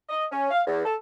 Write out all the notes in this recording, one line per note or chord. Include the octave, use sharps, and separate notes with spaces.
D#5
C#4
F5
E2
A4